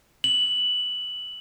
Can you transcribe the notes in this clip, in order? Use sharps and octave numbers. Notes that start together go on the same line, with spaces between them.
F#7